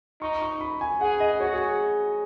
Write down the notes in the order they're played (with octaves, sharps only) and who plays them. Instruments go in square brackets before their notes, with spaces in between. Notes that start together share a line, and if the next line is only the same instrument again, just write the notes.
[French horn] D#4 [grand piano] C#6
[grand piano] C#6
B5
G#5
[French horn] G#4 [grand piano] F#5
[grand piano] D#5
[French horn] F#4 [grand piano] C#5
[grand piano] G#4